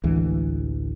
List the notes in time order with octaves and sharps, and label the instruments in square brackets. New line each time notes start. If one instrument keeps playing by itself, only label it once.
[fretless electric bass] A1 D2 E3 G#3